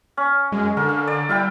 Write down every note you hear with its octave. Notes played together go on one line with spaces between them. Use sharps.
C#4
F#2 G#3
D3 A#4
F5
D5
G3 E4 F5 G5